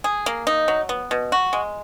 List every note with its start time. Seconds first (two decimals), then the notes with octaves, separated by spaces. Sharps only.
0.04 G#4
0.26 A#3
0.47 D#4
0.68 F#3
0.89 B3
1.11 B2
1.32 F#4
1.53 G#3